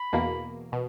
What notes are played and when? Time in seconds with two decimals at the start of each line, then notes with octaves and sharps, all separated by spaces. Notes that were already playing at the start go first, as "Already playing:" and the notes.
Already playing: B5
0.13 E2 B2 A#3
0.72 B2